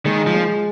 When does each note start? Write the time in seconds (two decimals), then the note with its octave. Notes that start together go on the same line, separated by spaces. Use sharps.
0.05 D#3 G#3
0.27 F3
0.34 G#3